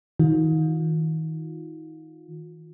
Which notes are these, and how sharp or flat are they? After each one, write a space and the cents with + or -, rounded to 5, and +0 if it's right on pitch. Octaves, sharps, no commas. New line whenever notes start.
D#3 +30 F4 +35